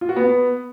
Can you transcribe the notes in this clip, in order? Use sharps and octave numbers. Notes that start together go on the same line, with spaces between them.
F4
F#4
B3